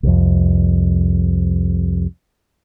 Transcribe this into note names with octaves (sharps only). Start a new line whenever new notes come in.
C2 F2